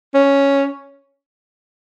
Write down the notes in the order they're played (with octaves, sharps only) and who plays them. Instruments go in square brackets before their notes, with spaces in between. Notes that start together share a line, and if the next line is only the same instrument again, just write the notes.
[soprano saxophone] C#4